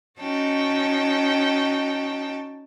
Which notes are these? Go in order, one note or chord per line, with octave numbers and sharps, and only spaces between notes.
C#4 D#4 F#4 G5 A5